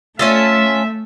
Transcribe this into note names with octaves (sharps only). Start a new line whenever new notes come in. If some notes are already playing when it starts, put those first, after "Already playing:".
A3 C#4 F4 A4 E5